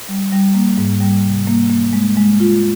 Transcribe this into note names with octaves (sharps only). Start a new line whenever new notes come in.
G3
G3
A#3
G#2
G3
C3
A#3
A#3
G#3
G#3
F4